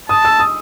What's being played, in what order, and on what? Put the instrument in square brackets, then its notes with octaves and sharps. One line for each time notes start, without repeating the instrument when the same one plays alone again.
[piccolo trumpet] A5 [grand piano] D#6
[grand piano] E6
D#6